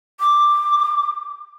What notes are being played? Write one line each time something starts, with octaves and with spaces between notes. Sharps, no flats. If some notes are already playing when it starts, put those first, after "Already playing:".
D6